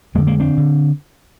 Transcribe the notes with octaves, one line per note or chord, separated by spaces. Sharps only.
F2 D3 G#3 A#3
G#3 A#3
C4 D4
D3